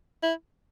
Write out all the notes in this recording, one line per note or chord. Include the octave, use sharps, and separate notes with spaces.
E4